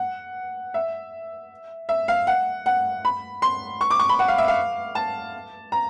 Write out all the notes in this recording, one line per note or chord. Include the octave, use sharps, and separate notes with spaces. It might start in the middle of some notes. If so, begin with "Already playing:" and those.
Already playing: F#5
E5
E5
F5
F#5
F#5
B5
C6
C#6
D6
C#6
B5
F#5
F5
E5
F5
A5
A#5